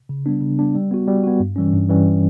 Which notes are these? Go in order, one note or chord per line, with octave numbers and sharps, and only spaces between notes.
C#3
G3 B3 D4
C#3
G3 B3 D4
G3
B3 F#4
G3
B3 F#4
G2
E3 G3 C#4
G2
E3 G3 C#4